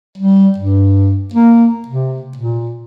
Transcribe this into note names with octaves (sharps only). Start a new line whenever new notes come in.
G3
G2
A#3
C3
A#2